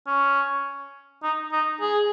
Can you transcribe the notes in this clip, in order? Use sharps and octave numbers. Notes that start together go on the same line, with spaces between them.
C#4
D#4
D#4
G#4